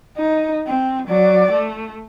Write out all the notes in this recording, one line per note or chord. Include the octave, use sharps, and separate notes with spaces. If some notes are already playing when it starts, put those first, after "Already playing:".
D#4
C4
F#3 D5
A3